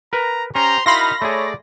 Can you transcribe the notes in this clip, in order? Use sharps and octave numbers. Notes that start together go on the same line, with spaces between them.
A#4 B4 A#5
C#4 G4 C5 A#5 C6
D#4 E4 F#4 A#4 F5 B5 C6 A#6
A3 G#4 C#5 D5